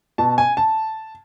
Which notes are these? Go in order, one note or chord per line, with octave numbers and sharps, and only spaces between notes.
B2 A5
G#5
A5